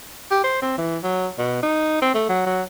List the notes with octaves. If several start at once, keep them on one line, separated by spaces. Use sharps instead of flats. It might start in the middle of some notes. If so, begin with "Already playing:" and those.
G4
C5
C4
E3
F#3
B2
D#4
C4
A3
F#3
F#3